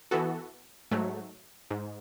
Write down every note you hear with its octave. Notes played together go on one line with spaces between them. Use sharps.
E3 B3 F#4 A4
G#2 F#3 A3
G#2